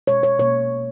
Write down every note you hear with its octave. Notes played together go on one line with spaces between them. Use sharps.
B2 G#3 C#5
C#5
B2 A#3 C#5